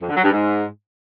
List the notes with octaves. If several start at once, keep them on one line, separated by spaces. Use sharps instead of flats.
F2
D3
F#3
G2
G#2